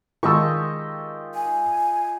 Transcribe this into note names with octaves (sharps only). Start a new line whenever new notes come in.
D#3 G#3 F4 G4 D#5 A5 C#6 E6
G#5